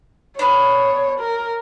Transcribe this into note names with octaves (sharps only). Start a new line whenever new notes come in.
B3 D4 C#5
A#4